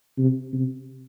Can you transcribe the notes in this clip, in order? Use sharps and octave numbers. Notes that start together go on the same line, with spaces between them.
C3
C3